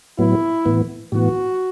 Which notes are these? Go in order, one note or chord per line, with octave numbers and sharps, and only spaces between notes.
A2 F#3 B3 E4
A2 E3 B3
A2 E3 B3 F#4